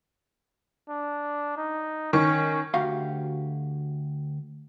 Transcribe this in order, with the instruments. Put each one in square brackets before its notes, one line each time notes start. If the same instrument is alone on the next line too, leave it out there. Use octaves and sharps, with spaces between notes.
[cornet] D4
D#4
[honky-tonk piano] D#3 C#6 [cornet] C#4
[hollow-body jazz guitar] D2 F#4 G4 F5